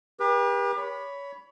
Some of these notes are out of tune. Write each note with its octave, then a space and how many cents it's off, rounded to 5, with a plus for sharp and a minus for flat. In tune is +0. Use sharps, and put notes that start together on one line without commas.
G4 +35 B4 -40
C#5 +25 B5 +0